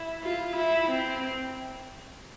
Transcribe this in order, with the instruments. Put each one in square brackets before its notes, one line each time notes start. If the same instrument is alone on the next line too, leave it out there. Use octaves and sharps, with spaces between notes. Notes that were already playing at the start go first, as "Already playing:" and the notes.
Already playing: [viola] E4
F4
E4
C4